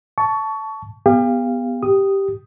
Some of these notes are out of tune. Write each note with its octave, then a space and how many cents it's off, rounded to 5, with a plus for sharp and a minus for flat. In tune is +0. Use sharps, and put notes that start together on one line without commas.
A5 -5 C#6 +20
B3 +0 G4 +40 F5 -10
G4 +0 D#6 +0